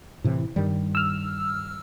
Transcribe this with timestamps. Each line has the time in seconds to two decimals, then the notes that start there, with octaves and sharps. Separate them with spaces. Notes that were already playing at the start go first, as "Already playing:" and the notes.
0.24 A2 C3 E3
0.56 G2 D#3 G3
0.95 E6 F6